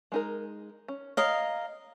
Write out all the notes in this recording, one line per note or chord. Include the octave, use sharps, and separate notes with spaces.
G#3 D#4 A#4
C#4
A#4 C#5 D#5 F5